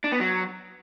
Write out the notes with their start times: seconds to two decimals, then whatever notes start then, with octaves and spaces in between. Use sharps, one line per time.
0.04 D4
0.12 B3
0.20 F#3